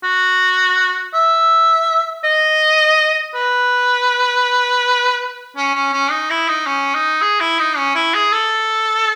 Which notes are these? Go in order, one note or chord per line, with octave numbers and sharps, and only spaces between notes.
F#4
E5
D#5
B4
C#4
C#4
C#4
D#4
E4
D#4
C#4
D#4
G#4
E4
D#4
C#4
E4
G#4
A4